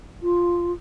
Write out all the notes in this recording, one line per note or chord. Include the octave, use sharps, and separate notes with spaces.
F4